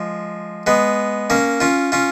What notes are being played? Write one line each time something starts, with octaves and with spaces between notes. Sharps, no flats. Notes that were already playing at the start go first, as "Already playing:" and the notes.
Already playing: F3 G#3
G#3 B3
A#3 C#4
C#4 F4
C#4 F4